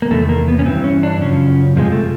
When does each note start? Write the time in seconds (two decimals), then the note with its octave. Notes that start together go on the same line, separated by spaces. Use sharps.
0.02 A#3
0.11 E2 C3 D#3 A3
0.29 A#3
0.48 B3
0.59 C#4
0.66 G2 E3 C4
0.84 C#4
1.03 D4
1.20 F#2 C#3 F3 C#4
1.76 F2 C3 F3 G#3
1.92 A3